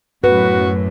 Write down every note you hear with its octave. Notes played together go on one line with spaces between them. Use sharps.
F#2 A2 F#4 B4